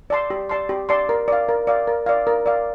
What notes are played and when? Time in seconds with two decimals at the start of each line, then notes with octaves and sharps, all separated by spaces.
0.10 D5 A5 C6
0.30 G4
0.49 D5 A5 C6
0.69 G4
0.89 D5 A5 C6
1.09 A#4
1.28 D5 F5
1.49 A#4
1.67 D5 F5
1.87 A#4
2.06 D5 F5
2.27 A#4
2.46 D5 F5